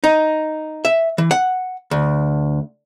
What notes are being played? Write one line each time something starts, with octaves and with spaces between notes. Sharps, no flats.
D#4
E5
E3
F#5
D2